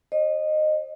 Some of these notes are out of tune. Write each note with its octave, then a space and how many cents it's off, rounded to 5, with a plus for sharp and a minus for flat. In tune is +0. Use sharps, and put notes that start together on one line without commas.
C5 +40 D#5 -15